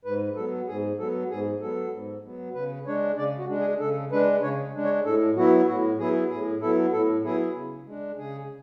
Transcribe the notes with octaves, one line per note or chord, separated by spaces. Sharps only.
G#2 B4
F#3 B3 A4
G#2 G#4
F#3 B3 A4
G#2 G#4
F#3 B3 A4
G#2
F#3 B3
C#3 B4
G#3 D4 C#5
C#3 D5
F#4
G#3 D4
G#4
C#3 A4
G#3 D4 B4
C#3 C#5
G#3 D4
C#5
A2 A4
F#3 B3 E4 F#4
A2 F#4
F#3 B3 E4 G#4
A2 G#4
F#3 B3 E4 A4
A2 A4
F#3 B3 E4 G#4
C#3
G#3 D4
C#3 G#4